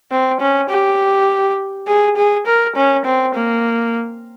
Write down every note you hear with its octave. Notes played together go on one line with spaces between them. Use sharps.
C4
C#4
G4
G#4
G#4
A#4
C#4
C4
A#3